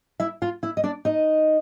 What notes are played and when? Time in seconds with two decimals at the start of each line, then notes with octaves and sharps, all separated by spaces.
0.20 E4 E5
0.42 F4 F5
0.63 E4 E5
0.77 D#5
0.84 D4 D5
1.05 D#4 D#5